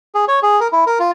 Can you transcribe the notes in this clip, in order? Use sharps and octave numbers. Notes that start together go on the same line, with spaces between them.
G#4
C#5
G#4
A#4
E4
A#4
F4